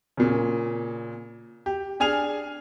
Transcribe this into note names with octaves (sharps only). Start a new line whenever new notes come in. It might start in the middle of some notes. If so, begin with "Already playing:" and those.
A#2 C#3
G4
D4 G#4 G#5 F6 F7